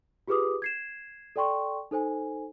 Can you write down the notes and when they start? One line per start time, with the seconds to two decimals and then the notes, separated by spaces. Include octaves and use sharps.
0.28 F4 G4 G#4 B4 D6 D#6
0.62 G#6 C7 E7
1.36 A4 D5 G5 C6 C#6
1.91 D#4 A4 C5 G#5